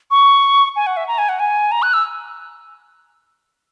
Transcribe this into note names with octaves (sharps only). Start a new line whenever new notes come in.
C#6
G#5
F#5
E5
A#5
G#5
F#5
G#5
A#5
F#6
E6